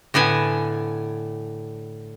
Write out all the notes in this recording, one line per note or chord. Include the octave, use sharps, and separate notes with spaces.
A2 D3 B3 G#5